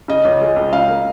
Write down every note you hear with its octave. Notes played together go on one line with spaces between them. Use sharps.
C#3 D#5
C#2
G#3
C#2
C#3 F5
A#3